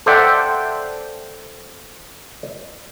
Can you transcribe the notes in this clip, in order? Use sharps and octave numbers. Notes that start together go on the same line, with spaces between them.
A4 C5 D5 E5 F#5 G5